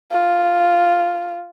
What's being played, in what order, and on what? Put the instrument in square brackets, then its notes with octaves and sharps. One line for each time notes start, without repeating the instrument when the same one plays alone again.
[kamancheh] F4